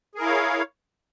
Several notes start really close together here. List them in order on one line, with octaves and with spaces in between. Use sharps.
G#4 A#4 E4 F5 C#5